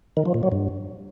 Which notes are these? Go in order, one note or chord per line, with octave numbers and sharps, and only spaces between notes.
D#3
F3
A#2
F#3
G2